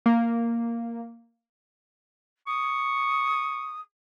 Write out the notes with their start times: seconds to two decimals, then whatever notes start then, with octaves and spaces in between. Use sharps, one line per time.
0.06 A#3
2.47 C#6 D#6